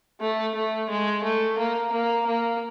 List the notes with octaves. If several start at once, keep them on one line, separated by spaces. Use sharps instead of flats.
A3
A3
G#3
A3
A#3
A#3
A#3